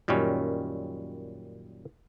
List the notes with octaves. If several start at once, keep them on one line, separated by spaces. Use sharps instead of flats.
F#2 A#2 D#3 G3 C#4